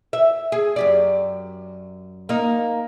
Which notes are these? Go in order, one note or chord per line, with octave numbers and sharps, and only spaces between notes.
E5
G#4
F#2 G4 D5
A#3 D#4